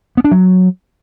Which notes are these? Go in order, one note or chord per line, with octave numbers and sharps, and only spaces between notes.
B3
D4
F#3